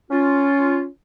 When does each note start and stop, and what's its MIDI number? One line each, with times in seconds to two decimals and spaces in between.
0.11 0.85 61
0.11 0.85 65